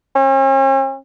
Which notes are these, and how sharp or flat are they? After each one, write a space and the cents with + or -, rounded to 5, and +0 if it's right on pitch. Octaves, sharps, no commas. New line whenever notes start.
C#4 -45